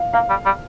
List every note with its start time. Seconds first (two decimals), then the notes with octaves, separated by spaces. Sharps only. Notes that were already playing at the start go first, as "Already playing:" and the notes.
Already playing: F5
0.13 A#3 F5
0.29 G3
0.45 G3